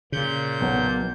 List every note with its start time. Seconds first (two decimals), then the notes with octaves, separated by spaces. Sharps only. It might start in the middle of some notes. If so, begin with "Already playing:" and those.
0.12 A#2 C#3 G6
0.61 B1 B2 F#3